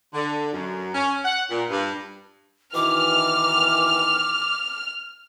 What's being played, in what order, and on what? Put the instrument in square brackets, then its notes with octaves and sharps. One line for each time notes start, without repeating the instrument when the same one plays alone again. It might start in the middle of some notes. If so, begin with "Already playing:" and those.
[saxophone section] D3
F#2
C#4
F#5
A#2
G2
[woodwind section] B2 D#3 E3 [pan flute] D6 [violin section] F6